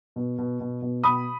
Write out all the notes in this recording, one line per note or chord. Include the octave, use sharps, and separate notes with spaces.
B2
B2
B2
B2
B2 B5 D#6